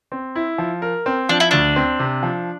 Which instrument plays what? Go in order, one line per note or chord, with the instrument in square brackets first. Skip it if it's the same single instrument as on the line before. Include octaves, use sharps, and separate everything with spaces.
[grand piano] C4
E4
F3
A#4
C4
[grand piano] F3 [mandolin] D4
[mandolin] E4
[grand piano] D2 [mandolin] D4
[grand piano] C4
C3
F3